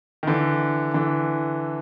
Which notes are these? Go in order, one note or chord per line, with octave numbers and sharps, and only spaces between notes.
D#3
D3 E3
D3 E3